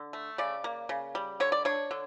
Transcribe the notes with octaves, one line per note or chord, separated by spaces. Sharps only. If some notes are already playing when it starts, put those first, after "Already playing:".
Already playing: D3
A3
C#3 D5
A#3
C#3
G3
D3 C#5
D5
D4 C#5
D3